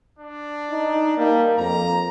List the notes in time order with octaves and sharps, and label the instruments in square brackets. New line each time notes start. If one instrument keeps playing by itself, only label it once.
[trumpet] D4
[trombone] D#4
[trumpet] G3 [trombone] A#3
[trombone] F2 [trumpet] A#5